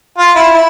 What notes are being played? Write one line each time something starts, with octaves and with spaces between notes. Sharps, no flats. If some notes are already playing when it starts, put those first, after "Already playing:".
F4
E4
E4